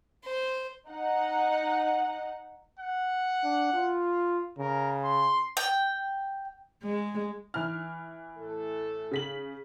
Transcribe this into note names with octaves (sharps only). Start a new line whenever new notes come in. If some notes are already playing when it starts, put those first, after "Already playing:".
C5
D#4 F#5
F#5
D4
F4
C#3 A#4
C6
G5
G#3
E3 F6
A2 A3 A4
C#3 B6 F#7